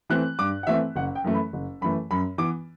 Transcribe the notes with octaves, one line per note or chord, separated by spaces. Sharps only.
E3 A3 C4 F#6
G2 D6
F#5
E3 A3 C4 E5
F#1 F#5
G5
F#2 E3 A3
B5
F#1
F#2 E3 A3 B5
F#2 B5
E3 B3 D6